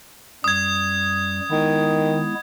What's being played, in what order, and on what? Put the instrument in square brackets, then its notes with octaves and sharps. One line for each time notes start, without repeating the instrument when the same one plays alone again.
[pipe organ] F#2 G3 [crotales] D#6 G#6
[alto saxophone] D#3 [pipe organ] G#3 B3 E4